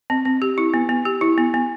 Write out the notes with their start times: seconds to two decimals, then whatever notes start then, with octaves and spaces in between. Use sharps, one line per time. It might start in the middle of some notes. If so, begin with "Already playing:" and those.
0.10 C4
0.25 C4
0.42 G4
0.58 E4
0.74 B3
0.89 B3
1.05 G4
1.21 E4
1.38 B3
1.54 B3